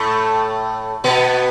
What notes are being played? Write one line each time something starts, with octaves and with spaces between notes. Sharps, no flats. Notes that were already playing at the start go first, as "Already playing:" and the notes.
Already playing: A2 A3
B2 B3